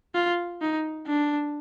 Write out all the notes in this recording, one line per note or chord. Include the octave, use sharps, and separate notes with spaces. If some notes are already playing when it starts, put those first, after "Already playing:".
F4
D#4
D4